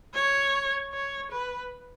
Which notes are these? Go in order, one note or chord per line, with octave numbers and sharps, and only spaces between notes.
C#5
C#5
B4